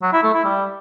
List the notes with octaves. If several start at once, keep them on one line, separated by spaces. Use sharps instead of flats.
F#3
E4
A3
E4
G3